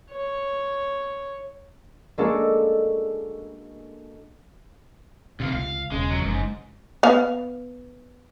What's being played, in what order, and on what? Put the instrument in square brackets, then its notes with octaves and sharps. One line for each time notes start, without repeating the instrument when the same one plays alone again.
[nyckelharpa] C#5
[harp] G#3 A#3 D4 F#4 A4
[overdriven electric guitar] D2 F5 [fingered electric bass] C3
[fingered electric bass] C#2 [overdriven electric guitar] F5
[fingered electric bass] E1 C#3 [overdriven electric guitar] G#3
[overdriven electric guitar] F#3
[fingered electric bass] F#1 C#3 [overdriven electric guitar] G#2
[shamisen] B3 F5